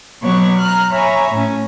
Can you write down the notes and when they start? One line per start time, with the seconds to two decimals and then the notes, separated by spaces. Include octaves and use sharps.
0.22 B2 F#3 B3 C#5 D5 C#6
0.58 A#5 F6 F#6
0.91 C#5 E5 G#5 A#5 B5 C#6
1.31 A2 C#4